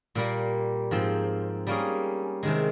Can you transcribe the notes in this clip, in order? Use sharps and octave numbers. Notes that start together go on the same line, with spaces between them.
A#2 G3 A#3
G#2 F3 C4
G3 A#3 C#4 G#4
C3 D#3 G#3